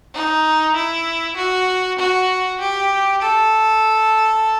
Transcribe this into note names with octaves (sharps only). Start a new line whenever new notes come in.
D#4
E4
F#4
F#4
G4
A4